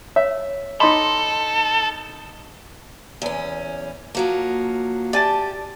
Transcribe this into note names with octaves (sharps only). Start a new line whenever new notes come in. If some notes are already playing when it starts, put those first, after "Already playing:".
C#5 E5
D#4 A4 D#5 B5 C6 D6
E2 C#4
F3 F#3 A#3
G4 D5 G#5 A5